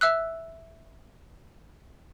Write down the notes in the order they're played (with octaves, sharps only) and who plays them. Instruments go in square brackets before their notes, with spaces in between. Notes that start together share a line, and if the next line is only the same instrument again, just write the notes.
[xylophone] E5 E6 F#6